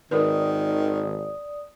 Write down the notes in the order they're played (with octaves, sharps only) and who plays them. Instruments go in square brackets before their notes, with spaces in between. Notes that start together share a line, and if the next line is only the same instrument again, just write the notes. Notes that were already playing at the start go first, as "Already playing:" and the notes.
[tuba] G#1 [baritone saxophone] D#3 [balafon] D#4 A#4 B4 [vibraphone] D5 D#6